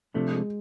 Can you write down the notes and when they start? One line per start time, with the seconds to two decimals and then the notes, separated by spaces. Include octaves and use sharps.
0.14 C3 F3 A3 D4
0.31 G#3